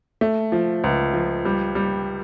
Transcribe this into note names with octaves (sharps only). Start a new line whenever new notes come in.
A3
F3
C#2
F3
G3
G3